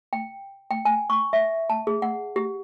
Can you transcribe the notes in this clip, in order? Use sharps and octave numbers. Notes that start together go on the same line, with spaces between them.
G5
G5
G#5
C#6
E5
A5
G#4
F#5
G4